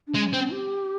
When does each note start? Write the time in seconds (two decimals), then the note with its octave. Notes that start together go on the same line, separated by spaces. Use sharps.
0.07 D4
0.15 G#3 C#4
0.33 C4
0.51 G4